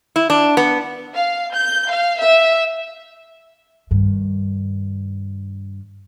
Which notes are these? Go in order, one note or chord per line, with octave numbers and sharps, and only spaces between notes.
E4
D4
B3
F5
G6
F5
E5
G2 D#3